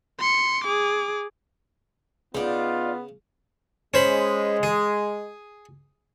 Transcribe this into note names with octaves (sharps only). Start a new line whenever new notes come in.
C6 C#7
G#4 D6
C#3 B3 D#4 F4 D5
G#3 C#4 C5 B5
G#4